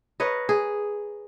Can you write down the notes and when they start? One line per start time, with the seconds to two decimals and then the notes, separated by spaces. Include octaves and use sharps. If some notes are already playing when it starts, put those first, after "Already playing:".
0.20 A#4 B4 C#5 D#5
0.49 G#4